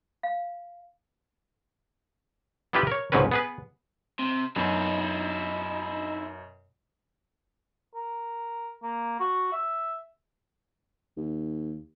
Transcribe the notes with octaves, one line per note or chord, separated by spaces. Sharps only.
F5
B3 D4 E4 F4 G4 B4
A#4 C#5
C#2 G#2 B2 C4 C#4 B4
B3 G#4 B4
C3
F#2 B2 D#4 E4 B5
A#4
A#3
F#4
E5
D#2